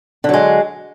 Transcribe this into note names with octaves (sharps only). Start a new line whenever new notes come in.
D3 F#3 G#3